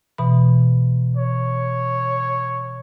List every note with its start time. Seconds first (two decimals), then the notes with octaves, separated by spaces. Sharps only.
0.18 B2 E3 B5
1.17 C#5